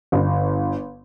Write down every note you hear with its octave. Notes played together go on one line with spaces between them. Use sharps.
G1